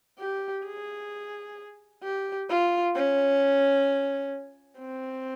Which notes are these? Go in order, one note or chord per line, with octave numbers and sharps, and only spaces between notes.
G4
G#4
G4
F4
C#4
C4